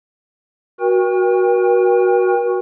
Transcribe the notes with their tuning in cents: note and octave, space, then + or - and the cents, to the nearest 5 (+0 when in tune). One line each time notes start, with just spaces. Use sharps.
F#4 +0 A#4 +45 G5 +45